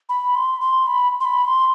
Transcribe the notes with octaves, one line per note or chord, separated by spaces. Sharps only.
B5
C6
C6
B5
C6
B5
C6